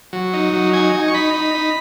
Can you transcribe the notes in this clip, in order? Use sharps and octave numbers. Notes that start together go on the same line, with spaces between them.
F#3
D#4
F#3
D#4 G#5
D#4
C#6
D#4 B5
D#4
D#4